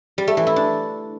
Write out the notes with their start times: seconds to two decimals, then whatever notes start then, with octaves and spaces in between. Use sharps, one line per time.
0.18 G3
0.27 A3
0.37 E3
0.47 E4
0.56 D4